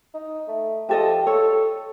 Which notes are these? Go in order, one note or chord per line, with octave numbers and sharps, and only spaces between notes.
D#4
A3
F3 G4 A4 D#5
A4 C#5